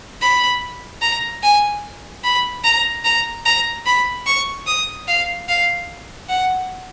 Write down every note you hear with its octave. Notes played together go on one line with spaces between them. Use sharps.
B5
A#5
G#5
B5
A#5
A#5
A#5
B5
C#6
D#6
F5
F5
F#5